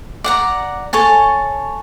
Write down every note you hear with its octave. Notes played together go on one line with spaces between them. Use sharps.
D5 F#5 A#5
A4 C#5 G#5 A5